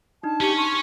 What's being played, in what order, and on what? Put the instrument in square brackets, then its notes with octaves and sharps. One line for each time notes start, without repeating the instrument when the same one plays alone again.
[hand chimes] D4 D#4 [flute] A5
[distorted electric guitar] C#4 C#5 [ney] G4
[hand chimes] C6 [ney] C#6